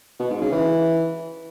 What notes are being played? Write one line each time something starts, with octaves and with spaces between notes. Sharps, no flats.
B2
G#2
C#3
E3